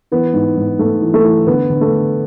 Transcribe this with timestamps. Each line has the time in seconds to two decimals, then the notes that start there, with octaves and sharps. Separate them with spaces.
0.12 E3 B3
0.34 G#2
0.57 G#2
0.79 G#2 A3
1.02 E3
1.14 A3
1.25 E3
1.47 D3 B3
1.70 D3
1.81 A3
1.92 D3